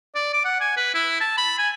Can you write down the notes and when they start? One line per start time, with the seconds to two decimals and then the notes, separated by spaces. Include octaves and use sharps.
0.15 D5
0.34 D6
0.45 F#5
0.61 G#5
0.77 B4
0.95 E4
1.21 A5
1.38 B5
1.58 G#5